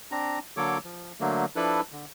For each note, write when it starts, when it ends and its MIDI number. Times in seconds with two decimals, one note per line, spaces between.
0.11 0.39 60
0.11 0.39 62
0.11 0.39 82
0.57 0.78 50
0.57 0.78 54
0.57 0.78 58
0.57 0.78 69
0.57 0.78 73
0.57 0.78 86
0.84 1.13 53
1.20 1.45 50
1.20 1.45 54
1.20 1.45 57
1.20 1.45 58
1.56 1.81 53
1.56 1.81 62
1.56 1.81 64
1.56 1.81 69
1.56 1.81 71
1.92 2.05 50